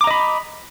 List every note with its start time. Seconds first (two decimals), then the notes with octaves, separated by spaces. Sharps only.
0.01 D6
0.04 A#5
0.07 D#5
0.11 B5